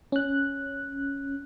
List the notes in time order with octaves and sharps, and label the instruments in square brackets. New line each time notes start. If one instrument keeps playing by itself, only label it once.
[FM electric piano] C#4 F#6